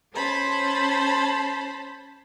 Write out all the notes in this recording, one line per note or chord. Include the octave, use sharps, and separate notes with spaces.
C#4 C5 A5 B5